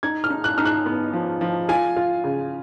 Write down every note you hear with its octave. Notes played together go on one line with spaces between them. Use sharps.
D#4 G#6
F6
D#4
F#6
D#4 F6
F#6
B3
F3
F3
F4 G#5
F4
C#3